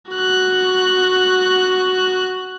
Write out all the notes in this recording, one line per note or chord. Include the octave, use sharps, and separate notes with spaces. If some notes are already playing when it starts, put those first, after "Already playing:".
F#4 F#6